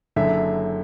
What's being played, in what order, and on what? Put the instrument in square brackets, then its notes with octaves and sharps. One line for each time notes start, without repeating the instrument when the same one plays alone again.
[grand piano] F#1 F#2 D3 E5